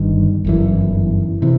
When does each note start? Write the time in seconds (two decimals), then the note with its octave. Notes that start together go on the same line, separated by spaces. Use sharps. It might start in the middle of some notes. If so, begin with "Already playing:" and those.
Already playing: G1 G2 D#3
0.45 G1 F#2 E3
1.42 C3 E3